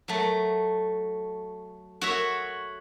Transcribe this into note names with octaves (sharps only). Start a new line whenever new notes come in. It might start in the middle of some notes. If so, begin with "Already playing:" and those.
F#3 A3
F#4 C#5 E5